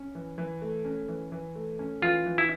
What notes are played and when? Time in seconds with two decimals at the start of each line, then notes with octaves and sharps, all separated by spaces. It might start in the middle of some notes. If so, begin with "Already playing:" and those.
Already playing: C#4
0.15 E3
0.38 E3
0.62 A3
0.85 C#4
1.08 E3
1.32 E3
1.55 A3
1.79 C#4
2.02 E3 F4
2.26 E3
2.38 E4